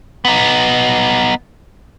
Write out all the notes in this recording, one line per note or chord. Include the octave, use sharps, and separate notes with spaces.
B3 D#4